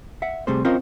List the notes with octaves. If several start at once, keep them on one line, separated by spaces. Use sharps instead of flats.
E5 F#5
C3 G3 A3 C4 G#4 C5
C4 C#4 F4 A#4 C5 D#5